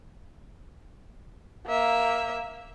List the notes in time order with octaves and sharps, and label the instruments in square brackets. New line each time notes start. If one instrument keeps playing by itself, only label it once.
[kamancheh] A#3 E5